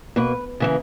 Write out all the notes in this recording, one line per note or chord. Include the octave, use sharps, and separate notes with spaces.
B2 A#3 B4
C#3 E3 A#3